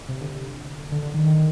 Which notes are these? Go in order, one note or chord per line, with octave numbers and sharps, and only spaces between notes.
C3
D3
D3
D3
D#3
D#3